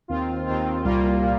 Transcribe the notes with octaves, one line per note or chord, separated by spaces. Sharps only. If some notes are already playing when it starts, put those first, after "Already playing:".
D#2 D#3 C4 F4
D#2 D#3 C4 F4
C2 A#2 G3 A#3 F4
A#2